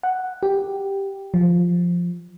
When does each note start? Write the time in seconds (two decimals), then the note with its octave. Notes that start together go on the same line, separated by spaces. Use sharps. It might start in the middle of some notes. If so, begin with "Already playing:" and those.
0.03 F#5
0.43 G4
1.34 F3